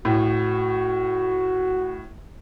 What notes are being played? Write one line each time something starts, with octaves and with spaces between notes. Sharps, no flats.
A2 F#4